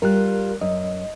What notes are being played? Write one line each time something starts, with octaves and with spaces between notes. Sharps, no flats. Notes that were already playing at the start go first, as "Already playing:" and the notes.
G3 F4 A#4 F#6
F#2 D#5